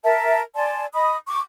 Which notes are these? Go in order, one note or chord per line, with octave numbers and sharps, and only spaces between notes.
A#4 E5 A5
D5 G#5 A5 C6
D#5 B5 D#6
C#6 D6